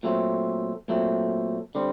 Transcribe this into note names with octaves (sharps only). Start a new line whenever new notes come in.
A#2 F#3 A3 C4
A#2 F#3 A3 C4
D3 G3 C4